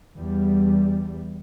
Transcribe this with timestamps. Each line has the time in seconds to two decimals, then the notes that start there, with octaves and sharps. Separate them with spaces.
0.16 E2 G3